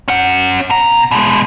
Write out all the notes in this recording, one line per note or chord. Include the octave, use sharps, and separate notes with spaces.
C#4 F#5
B2 A#5
B2 G#3